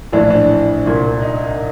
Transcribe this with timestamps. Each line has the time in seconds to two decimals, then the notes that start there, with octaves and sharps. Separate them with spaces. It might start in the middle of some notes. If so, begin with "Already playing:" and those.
0.12 A#1 A2 E3 D4
0.30 D4
0.86 C2 A#2
1.22 D#4